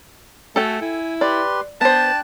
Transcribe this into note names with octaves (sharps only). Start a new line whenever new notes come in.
A3 F#4 A4 G5 G#5
E4 G#5
G4 B4 D5 C6
B3 D4 C5 G5 A5 F#6